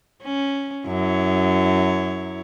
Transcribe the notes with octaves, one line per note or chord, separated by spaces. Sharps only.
C#4
F#2 E4 C#5